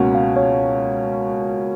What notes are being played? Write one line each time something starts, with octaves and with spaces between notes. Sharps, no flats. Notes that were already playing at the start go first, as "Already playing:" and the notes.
Already playing: C#2 B2 A#3 C#4 F#5
F5
C#5